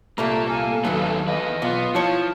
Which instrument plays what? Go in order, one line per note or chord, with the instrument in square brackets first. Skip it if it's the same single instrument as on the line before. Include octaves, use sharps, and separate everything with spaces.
[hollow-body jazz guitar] C2 A#2 A#5 [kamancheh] A3 [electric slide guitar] A#3
[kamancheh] A4 F5 [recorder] G#5
[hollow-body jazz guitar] D#2 F#3 [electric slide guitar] A3 D#4 B4
[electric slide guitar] E2 B4 [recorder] D#5
[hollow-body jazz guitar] B1 [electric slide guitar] B3 [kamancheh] F4
[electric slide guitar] F3 [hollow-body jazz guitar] E4 C#5 [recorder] A5